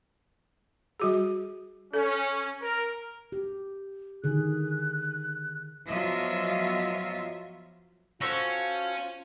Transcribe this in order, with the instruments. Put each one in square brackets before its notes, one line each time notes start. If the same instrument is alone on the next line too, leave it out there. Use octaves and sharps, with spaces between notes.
[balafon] G3 F#4 G#4
[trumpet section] C#4 [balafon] A4
[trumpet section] A#4
[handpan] G4
[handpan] D3 D#3 G#4 [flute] F#6
[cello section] F3 F#3 B3 F4 D#5 E5
[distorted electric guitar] C#4 [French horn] F4 [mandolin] F#4 A4 C5